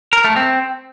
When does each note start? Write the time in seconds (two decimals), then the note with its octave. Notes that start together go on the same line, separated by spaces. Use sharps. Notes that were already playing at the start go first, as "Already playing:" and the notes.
0.13 A#4
0.24 A3
0.36 C4